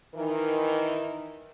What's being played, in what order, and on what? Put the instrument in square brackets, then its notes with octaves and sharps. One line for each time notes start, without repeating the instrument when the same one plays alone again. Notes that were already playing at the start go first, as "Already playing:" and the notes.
[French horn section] D#3 E3 A#4